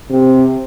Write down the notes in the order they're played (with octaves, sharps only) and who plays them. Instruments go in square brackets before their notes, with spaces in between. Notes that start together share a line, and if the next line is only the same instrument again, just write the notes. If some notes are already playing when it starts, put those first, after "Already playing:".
[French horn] C3